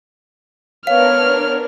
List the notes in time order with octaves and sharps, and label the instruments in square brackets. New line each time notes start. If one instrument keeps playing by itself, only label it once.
[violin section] B3 D4 A#4 [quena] C#5 [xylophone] F5 [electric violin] F6